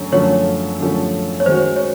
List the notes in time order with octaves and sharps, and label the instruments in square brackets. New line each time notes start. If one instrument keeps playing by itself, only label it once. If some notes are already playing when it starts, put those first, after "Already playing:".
Already playing: [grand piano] F#2 D3 A3 C#4
[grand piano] F#2 D3 F3 A3 C#4 [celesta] C#5
[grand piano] F#2 D3 F3 A3 C#4
[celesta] C#5
[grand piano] D#3 G#3 C#4 F#4 [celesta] C5
[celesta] C#5